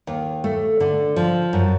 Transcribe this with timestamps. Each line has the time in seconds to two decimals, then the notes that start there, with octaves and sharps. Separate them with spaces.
0.07 D#2
0.44 A3
0.80 D3
1.16 F3
1.53 F#2